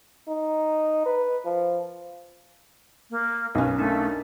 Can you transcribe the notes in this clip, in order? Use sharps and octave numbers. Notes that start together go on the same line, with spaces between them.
D#4
B4
F3
A#3
B1 C#4 A#4 B4
A3 D4 D#4 A#4